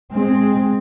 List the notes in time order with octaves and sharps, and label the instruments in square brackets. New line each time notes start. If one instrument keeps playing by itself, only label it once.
[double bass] G#3 C4